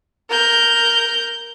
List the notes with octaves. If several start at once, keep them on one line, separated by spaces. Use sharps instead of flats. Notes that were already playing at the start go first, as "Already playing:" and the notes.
A#4 G6